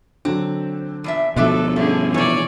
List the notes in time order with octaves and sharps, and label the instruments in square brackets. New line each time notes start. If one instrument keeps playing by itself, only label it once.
[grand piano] D3 F#3 [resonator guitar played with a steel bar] C4
[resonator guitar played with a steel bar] E2 A#2 E5 [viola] D4
[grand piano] D2 D6 [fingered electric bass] B2 F3 [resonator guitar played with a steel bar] G#3 D4 E5 [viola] A4
[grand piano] G2 C#4 [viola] D3 G#4 [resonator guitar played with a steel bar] A3
[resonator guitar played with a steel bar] C3 C#4 [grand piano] E3 [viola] C#5 D5